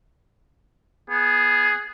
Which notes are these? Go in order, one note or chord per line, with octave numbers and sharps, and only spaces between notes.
B3 G#4